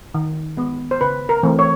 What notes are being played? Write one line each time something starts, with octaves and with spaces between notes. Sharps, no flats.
D#3
G#3 B3
C5
C#3 B4
A#4
E3 A3 C4
C#5